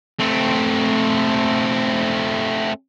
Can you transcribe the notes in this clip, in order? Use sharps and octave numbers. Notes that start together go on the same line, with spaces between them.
A3 C4